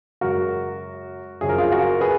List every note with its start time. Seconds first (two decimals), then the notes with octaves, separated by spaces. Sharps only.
0.21 F#2 C#3 G#3 F#4 A#4
1.41 F#2 C#3 F3 G#4
1.49 A#4
1.58 F4 G#4
1.72 F#4 A#4
2.01 G#4 B4